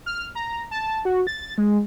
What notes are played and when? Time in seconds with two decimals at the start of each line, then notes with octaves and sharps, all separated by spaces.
0.06 F6
0.35 A#5
0.71 A5
1.05 F#4
1.27 A6
1.58 G#3